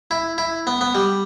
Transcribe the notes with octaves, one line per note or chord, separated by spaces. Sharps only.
E4
E4
B3
B3
G3